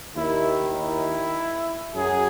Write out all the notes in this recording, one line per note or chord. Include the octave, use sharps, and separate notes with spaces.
D#2 D#3 E4
E4
F#2 F#3 G#4